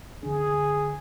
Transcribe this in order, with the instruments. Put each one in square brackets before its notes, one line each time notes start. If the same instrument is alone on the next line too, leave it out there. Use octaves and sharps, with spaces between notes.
[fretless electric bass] D3 D4 [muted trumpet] G#4